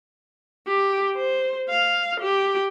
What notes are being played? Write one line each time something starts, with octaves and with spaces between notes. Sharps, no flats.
G4
C5
F5
G4